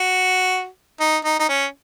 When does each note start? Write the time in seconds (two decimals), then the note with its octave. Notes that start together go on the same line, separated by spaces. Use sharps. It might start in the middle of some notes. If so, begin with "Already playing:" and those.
Already playing: F#4
1.00 D#4
1.24 D#4
1.39 D#4
1.49 C#4